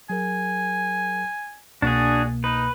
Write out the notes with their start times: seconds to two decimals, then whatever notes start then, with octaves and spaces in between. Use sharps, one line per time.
0.10 F#3 G#4 A#4 G#5
1.82 C2 B2 A#3 D4 F#4 G#4
2.44 D#4 B4